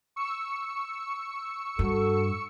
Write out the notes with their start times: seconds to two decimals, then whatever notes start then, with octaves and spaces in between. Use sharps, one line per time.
0.16 C#6 E6 C#7
1.79 G2 F#4 A4